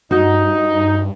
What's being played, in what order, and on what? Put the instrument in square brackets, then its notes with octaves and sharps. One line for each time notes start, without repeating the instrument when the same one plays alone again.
[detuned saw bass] G2 [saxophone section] D#4 [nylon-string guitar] F#4 D#5